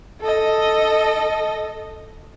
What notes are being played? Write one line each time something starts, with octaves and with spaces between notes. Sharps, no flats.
A4 D#5